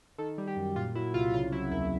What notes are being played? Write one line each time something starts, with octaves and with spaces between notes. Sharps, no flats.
D#3 A4
G3
G4
F#2
A#2 F4
F#3 E4
C2 F4
C#3 F4
F#3 E4
D#2 E4